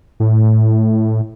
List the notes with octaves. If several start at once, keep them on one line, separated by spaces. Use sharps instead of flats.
A2